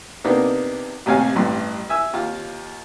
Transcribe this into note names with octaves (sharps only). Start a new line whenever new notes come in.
C3 A#3 B3 D4 D#4
A1 D#2 C3 C#5 F5 G#5
A1 G2 E3 C6
E5 G#5 E6
D#2 F4